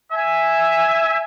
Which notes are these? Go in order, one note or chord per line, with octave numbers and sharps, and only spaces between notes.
E5 G#5